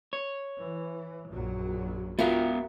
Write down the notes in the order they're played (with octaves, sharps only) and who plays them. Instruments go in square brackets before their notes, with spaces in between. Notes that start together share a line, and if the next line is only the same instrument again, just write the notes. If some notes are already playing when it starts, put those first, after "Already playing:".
[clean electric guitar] C#5
[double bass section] E3
A#1 F#2 F#3
[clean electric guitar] B3 F5 G5 [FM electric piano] F4 [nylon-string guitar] F#4 A#4 E5